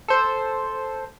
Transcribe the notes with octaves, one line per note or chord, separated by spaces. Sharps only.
A4 C5